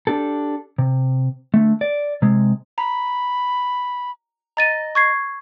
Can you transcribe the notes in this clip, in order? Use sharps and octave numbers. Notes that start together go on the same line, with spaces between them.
D4 G4 A4
C3
D3 A3
D5
C3 G#3
A#5 B5
D#5 A#5 A6 D#7
C#6 G#6 C7